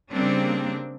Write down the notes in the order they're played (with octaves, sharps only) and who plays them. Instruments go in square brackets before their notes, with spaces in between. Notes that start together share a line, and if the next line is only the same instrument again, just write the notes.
[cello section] C#3 G3 A#3 C4 D4